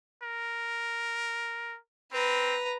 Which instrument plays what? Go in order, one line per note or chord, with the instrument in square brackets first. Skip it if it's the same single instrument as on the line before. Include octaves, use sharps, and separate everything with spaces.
[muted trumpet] A#4
[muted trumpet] C4 [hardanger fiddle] B4 A#5